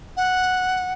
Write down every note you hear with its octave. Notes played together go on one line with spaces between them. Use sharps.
F#5